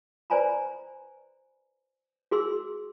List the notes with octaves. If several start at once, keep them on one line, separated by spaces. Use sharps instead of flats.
B4 C5 D5 G#5 A#5 B5
F#4 G#4 C6 E6